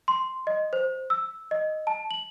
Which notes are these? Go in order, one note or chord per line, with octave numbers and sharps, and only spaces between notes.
C6
D#5
C5
E6
D#5
A5
F#7